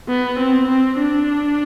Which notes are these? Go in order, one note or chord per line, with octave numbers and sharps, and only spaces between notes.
B3
C4
C4
D4